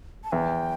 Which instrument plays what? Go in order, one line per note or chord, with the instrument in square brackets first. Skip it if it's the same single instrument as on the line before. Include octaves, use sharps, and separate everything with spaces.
[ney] A5
[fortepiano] E2 [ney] G5